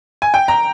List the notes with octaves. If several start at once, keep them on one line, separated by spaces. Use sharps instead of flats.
G#5
G5
A#5